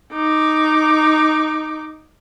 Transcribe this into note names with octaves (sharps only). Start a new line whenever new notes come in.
D#4 D6